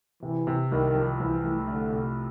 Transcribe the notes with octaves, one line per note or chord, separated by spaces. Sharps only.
C3 E3
C3
C2 D#3
F3
C2 E3
A3
D3 A3
C3